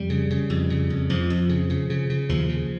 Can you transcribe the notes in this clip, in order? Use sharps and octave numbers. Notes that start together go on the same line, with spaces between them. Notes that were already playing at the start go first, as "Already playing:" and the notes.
Already playing: F2 G3
C#3
C#3
F2
C#3
F2
F2 F3
F2
C#3
C#3
C#3
C#3
D#2 F3
C#3